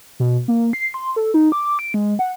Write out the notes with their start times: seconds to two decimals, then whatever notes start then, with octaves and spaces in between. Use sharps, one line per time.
0.20 B2
0.48 A#3
0.73 C7
0.94 C6
1.16 A4
1.34 D#4
1.52 D6
1.79 D7
1.94 G#3
2.19 F#5